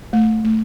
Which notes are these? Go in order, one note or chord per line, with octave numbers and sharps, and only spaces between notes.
A3
A3